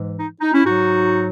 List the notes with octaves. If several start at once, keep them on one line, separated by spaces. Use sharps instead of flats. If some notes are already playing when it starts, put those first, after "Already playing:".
Already playing: G#2 E3 G#3
D#4
D#4
C#4 E4
G#2 F#3 D#4 F#4